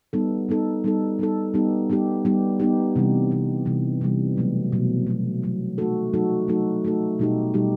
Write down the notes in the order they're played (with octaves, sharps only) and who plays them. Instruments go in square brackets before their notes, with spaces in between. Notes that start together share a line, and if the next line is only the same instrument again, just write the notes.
[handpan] G3 B3 D#4 A4
G3 B3 D#4 A4
G3 B3 D#4 A4
G3 B3 D#4 A4
G3 B3 D#4 G4
G3 B3 D#4 G4
G3 B3 D#4 G4
G3 B3 D#4 G4
C3 E3 G3
C3 E3 G3
C3 E3 G3
C3 E3 G3
B2 F#3 A3
B2 F#3 A3
B2 F#3 A3
B2 F#3 A3
F#3 A3 D#4 F#4 A4
F#3 A3 D#4 F#4 A4
F#3 A3 D#4 F#4 A4
F#3 A3 D#4 F#4 A4
B2 G3 D#4 G4
B2 G3 D#4 G4